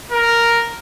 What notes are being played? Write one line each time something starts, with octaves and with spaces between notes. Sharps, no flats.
A#4